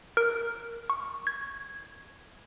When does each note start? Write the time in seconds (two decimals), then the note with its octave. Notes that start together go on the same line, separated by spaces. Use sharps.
0.17 A#4
0.90 C#6
1.27 G#6